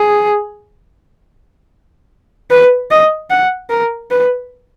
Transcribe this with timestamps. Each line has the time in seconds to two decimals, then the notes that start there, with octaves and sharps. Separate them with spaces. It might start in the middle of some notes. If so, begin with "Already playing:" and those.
Already playing: G#4
2.51 B4
2.90 D#5
3.30 F#5
3.70 A#4
4.11 B4